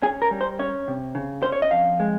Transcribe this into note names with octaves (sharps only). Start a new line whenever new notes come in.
C#4 G#4
A#4
G3
C5
C#4 C#5
C3
C#3
C#4 C5
C#5
D#5
F2 F5
G#3